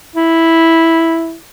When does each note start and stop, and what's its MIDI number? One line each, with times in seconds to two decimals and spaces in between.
0.16 1.36 64